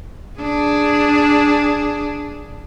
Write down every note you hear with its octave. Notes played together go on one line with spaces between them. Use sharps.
D4 G#4